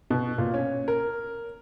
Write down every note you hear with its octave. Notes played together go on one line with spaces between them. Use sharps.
B2
A#2
C#4
A#4